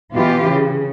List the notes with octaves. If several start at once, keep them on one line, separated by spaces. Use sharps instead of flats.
B2 E3 F4 G4
C#3